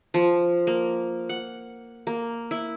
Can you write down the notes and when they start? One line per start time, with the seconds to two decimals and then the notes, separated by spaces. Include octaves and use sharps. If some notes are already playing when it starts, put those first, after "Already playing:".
0.14 F3
0.67 A#3
1.29 F#5
2.07 A#3
2.51 E4